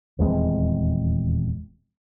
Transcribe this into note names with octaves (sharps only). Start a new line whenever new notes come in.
D#1 E2 G#3 C4